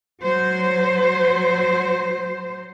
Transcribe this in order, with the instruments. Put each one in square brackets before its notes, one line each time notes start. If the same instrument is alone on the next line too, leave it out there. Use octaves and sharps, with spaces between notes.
[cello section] F#3 C5